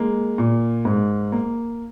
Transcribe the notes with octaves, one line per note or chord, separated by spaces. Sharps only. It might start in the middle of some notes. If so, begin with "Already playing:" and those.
Already playing: G#3 A#3
A#2
G#2
A#3